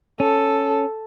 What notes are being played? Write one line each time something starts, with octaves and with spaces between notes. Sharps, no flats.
C#4 A4